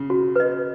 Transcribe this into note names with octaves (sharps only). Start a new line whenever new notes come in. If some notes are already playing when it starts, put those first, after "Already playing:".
Already playing: C#3
F#4
B4 D#5